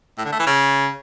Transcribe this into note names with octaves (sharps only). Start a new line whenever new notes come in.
A2
D3
A3
E3
C#3